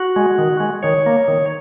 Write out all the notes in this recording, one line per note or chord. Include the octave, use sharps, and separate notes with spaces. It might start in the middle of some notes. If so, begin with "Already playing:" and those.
Already playing: F#4
G#3
D#3
G#3
D#3 C#5
A#3
D#3